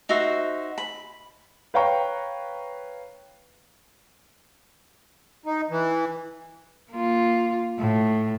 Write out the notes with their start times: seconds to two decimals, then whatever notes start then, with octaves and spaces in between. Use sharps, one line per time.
0.09 D#4 F#4 C5 E5
0.78 B5
1.74 B4 C#5 F5 G5 A#5 C#6
5.46 D#4
5.70 E3
6.92 A#3 F4
7.79 A2